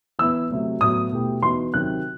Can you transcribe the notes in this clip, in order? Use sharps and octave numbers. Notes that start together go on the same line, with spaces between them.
E3 B3 E4 E6
C3 F#3 A3
A2 F#3 B3 F#4 D#6
B2 A3 E4 G4
E3 B3 D#4 F#4 C6
C3 D#3 F#3 C4 F#6